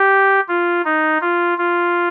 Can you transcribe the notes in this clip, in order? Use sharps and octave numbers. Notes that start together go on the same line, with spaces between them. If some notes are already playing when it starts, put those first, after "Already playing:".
Already playing: G4
F4
D#4
F4
F4